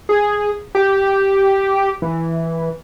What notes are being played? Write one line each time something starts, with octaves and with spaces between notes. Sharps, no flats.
G#4
G4
E3